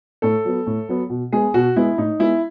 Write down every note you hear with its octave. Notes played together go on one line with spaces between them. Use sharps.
A2 A4
F#3 B3
A2
F#3 B3
B2
G#3 B3 G#4
B2 F#4
G#3 B3 E4
A2 D#4
G#3 B3 E4